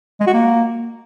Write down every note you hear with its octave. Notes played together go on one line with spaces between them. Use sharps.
G#3
F#4
A#3